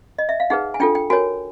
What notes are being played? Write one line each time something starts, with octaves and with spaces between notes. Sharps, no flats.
D#5
E5
F5
D#4 G#4 B4 F#5
G#5
D4 F4 A4 G5
G5
F#4 A#4 C#5 G#5